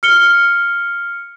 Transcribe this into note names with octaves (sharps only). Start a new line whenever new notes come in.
F6 C#7 G7